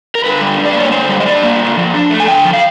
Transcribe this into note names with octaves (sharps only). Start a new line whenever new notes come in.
A#4
D3 B4
G3
D4
D5
A#3 C#5
D3 C5
G3
D#5
D4 D5
A#3
D3
F3
D4
A3
G#5
D3 G5
F3
F5